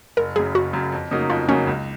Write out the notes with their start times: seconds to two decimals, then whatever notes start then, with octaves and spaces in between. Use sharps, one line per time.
0.17 F#1 A#4
0.36 F#2 C#3 G#4
0.55 F#1 F#4
0.73 F#2 C#3
0.92 F2
1.11 C#3 F#3 A#3 D#4
1.30 F2 F4
1.48 C#3 F#3 A#3 C#4 D#4
1.67 C#2